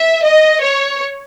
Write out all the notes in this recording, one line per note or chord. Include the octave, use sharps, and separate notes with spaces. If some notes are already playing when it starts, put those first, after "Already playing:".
Already playing: E5
D#5
C#5